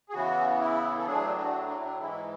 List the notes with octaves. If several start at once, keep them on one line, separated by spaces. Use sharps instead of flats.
G#4
C#3 E3 B3 F#4
E4
A4
A2 F#3 A3 D4 G#4
F#4
D4
E4
D4
G#2 E3 G#3 E4